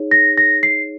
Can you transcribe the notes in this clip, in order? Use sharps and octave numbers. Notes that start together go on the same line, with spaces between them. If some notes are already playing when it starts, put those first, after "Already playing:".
Already playing: D#4 G#4 C#5
A#6
A#6
C7